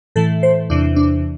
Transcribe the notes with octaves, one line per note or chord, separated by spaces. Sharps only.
A2 E3 A3 A4
C5
E2 C3 E3 D4
D4